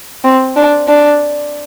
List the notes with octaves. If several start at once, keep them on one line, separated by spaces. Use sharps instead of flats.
C4
D4
D4